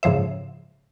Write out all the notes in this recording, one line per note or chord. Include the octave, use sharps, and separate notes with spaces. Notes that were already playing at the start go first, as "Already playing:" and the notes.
G#2 C#3 F3 C5 E5